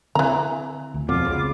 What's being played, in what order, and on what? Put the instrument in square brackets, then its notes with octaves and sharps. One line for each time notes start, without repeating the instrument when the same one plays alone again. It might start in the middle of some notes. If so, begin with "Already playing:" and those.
[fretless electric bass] D3 C4 [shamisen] E3 A#5
[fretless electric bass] D2
[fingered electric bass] F2 B2 [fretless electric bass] C4 [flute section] F4 D6
[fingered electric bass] C#2